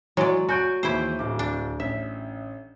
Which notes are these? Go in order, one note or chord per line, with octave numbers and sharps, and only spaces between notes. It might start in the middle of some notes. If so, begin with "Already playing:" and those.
E3 F#3 G#3 D5
F#4 G#5 G6 D7
D#2 E3 G#3 E4 C5
D1 D6
D4
A1 E5